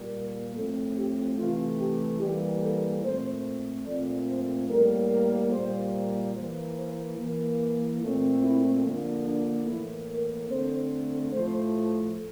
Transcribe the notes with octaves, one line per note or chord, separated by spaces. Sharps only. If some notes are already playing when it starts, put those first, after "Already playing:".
Already playing: A#2 G3 A#3
A#4
A2 F3 A3 C4 A4
G4
C3 E3 A3 F4
G4
E3 G3 A#3 G4
A4
A#2 A3 C4 C5
A#2 F3 A3 C4 D5
C5
A2 G3 A#3 A#4
A#4
A#2 G3 A#3 C5
E3 A#3 C5
C5
E3 A#3
A#2 A3 C4
E4
D3 F3 A#3
D4
A2 E3 A#3 E4
A#4
D3 A3 C4 C5
A2 F3 A3 C5